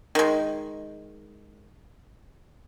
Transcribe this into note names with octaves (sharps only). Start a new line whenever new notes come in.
D#3 G#3